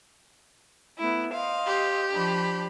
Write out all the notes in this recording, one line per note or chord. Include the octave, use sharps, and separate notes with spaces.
A3 B3 E4
C5 D#5 F5
G4
F3 D4 B5